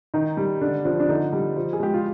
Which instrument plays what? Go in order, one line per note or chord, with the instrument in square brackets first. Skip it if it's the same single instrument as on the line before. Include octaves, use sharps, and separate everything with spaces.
[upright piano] D#3 D#4
G3
D3 D4
F3 D4
D4
D3 D#4
G3
F3
G#4
G#3 G4
F4